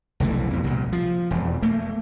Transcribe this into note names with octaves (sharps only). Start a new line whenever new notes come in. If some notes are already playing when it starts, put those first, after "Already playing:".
F1 B1 E3 A3
F2 B2
C2 A#2
F3
E1 F2
A3 A#3